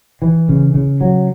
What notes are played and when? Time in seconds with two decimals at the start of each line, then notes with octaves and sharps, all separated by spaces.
0.22 E3
0.49 C#3
0.74 C#3
1.01 F#3